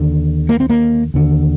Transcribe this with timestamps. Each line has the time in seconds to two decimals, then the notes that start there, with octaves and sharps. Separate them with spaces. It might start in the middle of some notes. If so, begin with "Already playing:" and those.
Already playing: D#2 D3
0.49 A#3
0.60 C4
0.70 A#3
1.14 D#2 D3